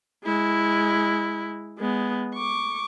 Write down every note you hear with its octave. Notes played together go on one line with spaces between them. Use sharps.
G#3 E4
G#3 B3
C#6 D6